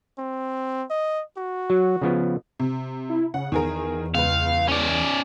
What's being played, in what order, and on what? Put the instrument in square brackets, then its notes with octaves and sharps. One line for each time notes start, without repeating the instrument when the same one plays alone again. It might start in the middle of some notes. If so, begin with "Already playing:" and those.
[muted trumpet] C4
D#5
F#4
[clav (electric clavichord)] F#3
C#3 F3 B3
[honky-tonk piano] C3
[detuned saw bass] E4
[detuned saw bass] C#3 [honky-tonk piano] F#5
[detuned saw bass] E2 [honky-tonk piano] D#3 G#4 A#4
[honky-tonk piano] C#2 B4 [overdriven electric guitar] F5
[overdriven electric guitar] C#4 D5